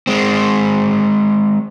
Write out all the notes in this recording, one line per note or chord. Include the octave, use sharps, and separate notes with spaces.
G#3 C4